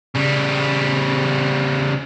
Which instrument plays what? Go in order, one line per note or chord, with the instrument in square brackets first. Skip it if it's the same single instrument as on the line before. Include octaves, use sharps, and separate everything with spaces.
[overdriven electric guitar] C#3 G3